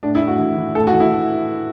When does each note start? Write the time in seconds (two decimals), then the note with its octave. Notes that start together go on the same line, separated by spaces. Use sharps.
0.03 A2 D4
0.15 E4
0.21 A2
0.27 F#4
0.39 E3
0.57 E3
0.75 A2 A4
0.87 F#4
0.93 E3
1.00 E4